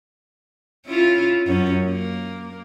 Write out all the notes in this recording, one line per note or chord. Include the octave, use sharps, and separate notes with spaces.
C#4 E4 F4
F#2 C#4
A#3